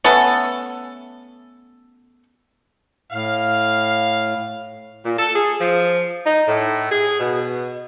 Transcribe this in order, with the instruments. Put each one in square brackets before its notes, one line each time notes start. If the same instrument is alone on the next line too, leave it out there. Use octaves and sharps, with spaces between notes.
[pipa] A3 B3 C#4 A4
[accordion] A2 [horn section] F5
[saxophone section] A#2
A4
G#4
F3
D#4
A2
G#4
B2